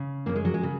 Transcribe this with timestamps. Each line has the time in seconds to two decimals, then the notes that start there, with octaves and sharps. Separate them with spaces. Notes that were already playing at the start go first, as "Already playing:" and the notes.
Already playing: C#3
0.26 F#2 C#3 A#3
0.35 G#3
0.45 F#3
0.54 G#3
0.63 C#3